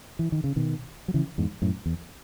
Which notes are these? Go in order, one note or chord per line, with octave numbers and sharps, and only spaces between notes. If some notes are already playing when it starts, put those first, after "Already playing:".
E3
D#3
C#3
B2 D#3
F#3
C#3 E3
E2 G#2
F#2 A2
E2